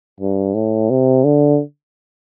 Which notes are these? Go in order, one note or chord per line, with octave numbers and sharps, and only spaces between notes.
G2
A2
C3
D3